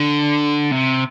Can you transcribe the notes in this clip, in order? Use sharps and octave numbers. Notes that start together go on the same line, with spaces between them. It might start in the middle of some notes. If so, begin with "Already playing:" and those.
Already playing: D3
C3